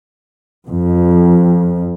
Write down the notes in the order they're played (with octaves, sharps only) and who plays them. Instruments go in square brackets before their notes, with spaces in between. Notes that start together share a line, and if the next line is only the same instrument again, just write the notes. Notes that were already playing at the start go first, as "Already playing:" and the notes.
[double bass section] F2